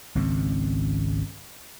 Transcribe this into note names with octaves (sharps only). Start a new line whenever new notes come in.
G#1 C#2 B2 C4